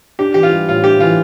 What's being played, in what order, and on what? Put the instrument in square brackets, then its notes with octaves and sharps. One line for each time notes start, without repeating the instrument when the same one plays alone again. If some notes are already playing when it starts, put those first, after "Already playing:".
[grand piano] D4 [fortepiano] G4
[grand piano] E3 [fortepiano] G4
[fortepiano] F4
[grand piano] G3
[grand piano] A2 [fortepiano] F4
[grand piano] D4 [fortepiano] G4
[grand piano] E3 [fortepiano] F4